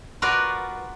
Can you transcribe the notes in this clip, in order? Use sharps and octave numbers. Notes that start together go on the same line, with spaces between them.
F4 F#4 A#4 B4 D5 F5